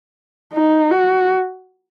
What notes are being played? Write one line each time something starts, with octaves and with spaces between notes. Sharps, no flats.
D#4
F#4